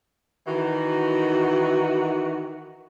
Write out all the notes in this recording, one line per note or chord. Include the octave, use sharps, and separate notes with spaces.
D#3 E3 F#4